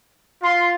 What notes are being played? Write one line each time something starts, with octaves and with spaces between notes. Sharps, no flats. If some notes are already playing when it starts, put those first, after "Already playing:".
F4 C6